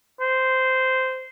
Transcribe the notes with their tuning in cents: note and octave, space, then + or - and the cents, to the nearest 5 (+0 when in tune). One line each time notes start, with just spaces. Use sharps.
C5 -10